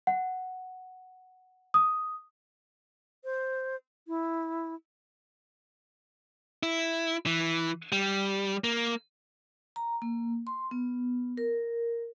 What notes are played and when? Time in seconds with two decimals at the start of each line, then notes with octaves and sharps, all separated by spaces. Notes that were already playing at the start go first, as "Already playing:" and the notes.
0.07 F#5
1.74 D#6
3.24 C5
4.08 E4
6.63 E4
7.26 E3
7.92 G3
8.64 A#3
9.76 A#5
10.02 A#3
10.47 C6
10.71 B3
11.37 A#4